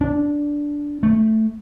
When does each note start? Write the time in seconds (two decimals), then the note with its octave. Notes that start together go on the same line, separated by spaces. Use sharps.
0.01 D4
1.03 A3